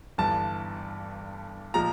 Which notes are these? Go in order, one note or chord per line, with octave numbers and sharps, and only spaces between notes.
G1 G2 E3 A5
A#2 F3 G#3 A#5